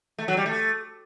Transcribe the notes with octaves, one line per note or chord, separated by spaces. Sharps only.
A3
F#3
G3
A3